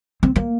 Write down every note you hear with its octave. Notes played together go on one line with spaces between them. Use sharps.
C4
A#3